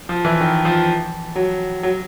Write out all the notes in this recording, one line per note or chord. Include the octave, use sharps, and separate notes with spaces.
F3
E3
D#3
F3
F#3
F#3